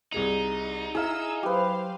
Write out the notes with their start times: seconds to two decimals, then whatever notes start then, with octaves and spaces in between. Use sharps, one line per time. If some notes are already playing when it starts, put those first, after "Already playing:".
0.12 C2 D#4 G#4 F7
0.95 E4 G#4 F5 A#5 E6
1.43 F#3 G4 B4 C5 F5